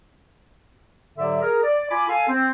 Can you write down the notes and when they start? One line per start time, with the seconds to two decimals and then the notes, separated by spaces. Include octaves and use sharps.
1.17 G#2 D3 F#3 G4 D5 E5
1.41 G#4 A#4
1.63 D5
1.90 F4 G#5 B5 D6
2.08 A4 F5 G#5
2.28 C4